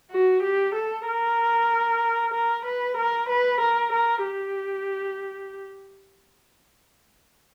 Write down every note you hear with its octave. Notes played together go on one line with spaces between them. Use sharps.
F#4
G4
A4
A#4
A#4
B4
A#4
B4
A#4
A#4
G4